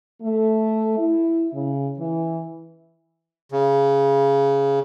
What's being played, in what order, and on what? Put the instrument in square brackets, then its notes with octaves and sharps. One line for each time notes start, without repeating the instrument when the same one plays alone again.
[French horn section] A3
E4
C#3
E3
[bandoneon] C#3